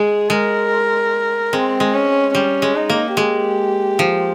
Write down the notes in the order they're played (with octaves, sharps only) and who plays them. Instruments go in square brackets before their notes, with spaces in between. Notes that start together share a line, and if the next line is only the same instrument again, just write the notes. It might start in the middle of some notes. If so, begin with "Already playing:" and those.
Already playing: [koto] G#3 [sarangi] G#4
[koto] G#3 [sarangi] A#4
[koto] G#3 [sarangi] C4
[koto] G#3
[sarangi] C#4
[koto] G3 [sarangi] C#4
[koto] G#3
[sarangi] D#4
[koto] A#3
[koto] G#3 [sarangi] G4
[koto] F3